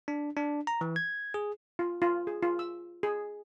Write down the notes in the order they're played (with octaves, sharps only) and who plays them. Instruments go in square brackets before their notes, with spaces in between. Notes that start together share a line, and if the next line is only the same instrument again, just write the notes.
[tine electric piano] D4
D4
A#5
E3
G#6
G#4
[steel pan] F4
F4
G#4
F4
E6
G#4